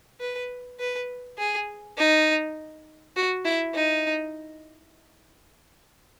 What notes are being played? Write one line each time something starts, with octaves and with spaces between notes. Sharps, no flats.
B4
B4
G#4
D#4
F#4
E4
D#4